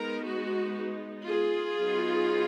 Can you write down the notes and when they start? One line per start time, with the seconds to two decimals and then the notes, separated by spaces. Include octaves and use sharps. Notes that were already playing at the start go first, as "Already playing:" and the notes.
Already playing: G#3 B3 D#4 A#4
0.25 F#4
1.26 F4 G#4
1.77 F#3 B3 D#4